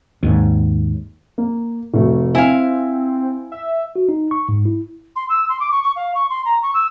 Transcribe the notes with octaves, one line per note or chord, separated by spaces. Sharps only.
D#2 G#2
A#3
F1 A3 F#4
C4 E4 F5 G#5
E5
F#4
D#4
C#6
G#2
E4
C6
E6
C6
D6
C#6
C#6
F5
C#6
C6
A#5
C#6
E6